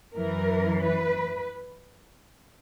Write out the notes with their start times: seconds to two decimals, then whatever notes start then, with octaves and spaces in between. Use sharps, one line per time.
0.14 F#2 E3 A#4
0.81 B4